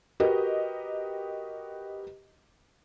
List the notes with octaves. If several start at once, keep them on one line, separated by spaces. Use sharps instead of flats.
F#4 G4 A#4 B4 D#5